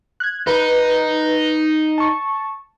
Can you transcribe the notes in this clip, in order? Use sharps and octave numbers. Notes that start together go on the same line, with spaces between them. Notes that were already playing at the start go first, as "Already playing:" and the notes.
F#6 G#6
D#4 B4 F#6
A5 C#6